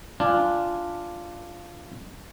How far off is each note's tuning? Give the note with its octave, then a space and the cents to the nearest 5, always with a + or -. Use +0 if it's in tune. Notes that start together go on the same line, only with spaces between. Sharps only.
D4 +0 F4 -10 G#5 -10